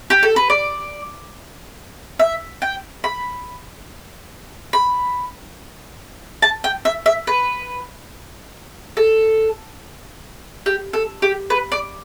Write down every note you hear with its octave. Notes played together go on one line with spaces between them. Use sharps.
G4
A4
B4
D5
E5
G5
B5
B5
A5
G5
E5
E5
B4
A4
G4
A4
G4
B4
D5